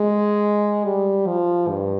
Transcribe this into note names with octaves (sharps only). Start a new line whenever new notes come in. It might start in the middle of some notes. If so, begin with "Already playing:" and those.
Already playing: G#3
G3
F3
G2